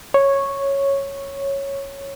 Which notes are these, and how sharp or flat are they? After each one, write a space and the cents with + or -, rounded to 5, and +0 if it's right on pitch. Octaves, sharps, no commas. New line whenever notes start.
C#5 -5